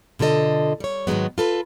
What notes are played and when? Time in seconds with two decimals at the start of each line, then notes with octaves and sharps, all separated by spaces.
0.19 B2 D3 F4 A4 D#5
0.80 G3 C#5
1.07 G#2 D#3 F#3 G#3 B3
1.38 F4 A4 B4